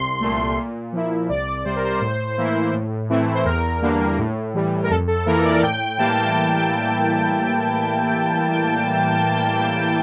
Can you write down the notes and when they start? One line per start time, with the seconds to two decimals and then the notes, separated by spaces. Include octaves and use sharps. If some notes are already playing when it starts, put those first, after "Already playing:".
Already playing: C2 C6
0.20 A#2 A3
0.56 A#2
0.92 F3 A#3 E4
1.29 C2 D5
1.65 C3 G3 C5
1.75 A#4
1.85 C5
2.01 A2
2.37 E3 A#3 E4
2.73 A2
3.09 E3 A3 C4 E4
3.34 C5
3.45 E2 A#4
3.81 D3 G3 A#3 D4
4.18 A2
4.54 E3 G3
4.83 A#4
4.90 F2 A4
5.08 A4
5.26 E3 A#3 E4 A#4
5.45 D5
5.62 A2 G5
5.98 E3 G3 A#3 E4 A5